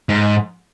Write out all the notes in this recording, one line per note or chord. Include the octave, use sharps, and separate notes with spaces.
G#2